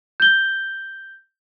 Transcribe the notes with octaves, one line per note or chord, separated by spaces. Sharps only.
G6 G7